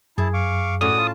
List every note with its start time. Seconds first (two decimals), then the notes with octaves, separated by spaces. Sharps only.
0.18 F#2 E4 G#4 A5
0.34 F5 C#6 D6
0.81 A2 C#4 F#4 D5 D#6
0.97 F4 A5